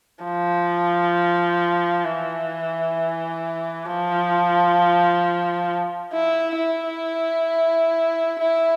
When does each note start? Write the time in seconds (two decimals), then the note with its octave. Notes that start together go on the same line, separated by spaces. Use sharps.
0.24 F3
2.05 E3
3.86 F3
6.13 E4
6.57 E4
8.39 E4